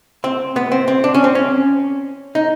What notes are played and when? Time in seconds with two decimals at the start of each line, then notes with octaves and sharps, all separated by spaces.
0.24 C4
0.56 B3
0.72 C4
0.88 C4
1.04 D4
1.14 C#4
1.24 C4
1.35 C#4
2.35 D#4